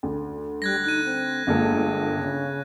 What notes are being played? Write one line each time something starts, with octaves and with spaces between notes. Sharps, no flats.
D2
G3 F#6 G#6 A#6
D#4 F#6 D#7
C4
G1 G#3 A#3 A4
C#3